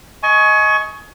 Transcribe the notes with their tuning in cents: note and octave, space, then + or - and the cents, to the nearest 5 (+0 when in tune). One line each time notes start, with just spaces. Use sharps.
D#5 +15 G#5 +30 C#6 +0